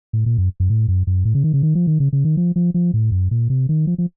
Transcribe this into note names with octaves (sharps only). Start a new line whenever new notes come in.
A2
A#2
F#2
F#2
A2
F#2
F#2
A2
C#3
D#3
C#3
D#3
F3
D#3
C#3
C#3
D#3
F3
F3
F3
A2
F#2
A#2
C3
D#3
F3
F3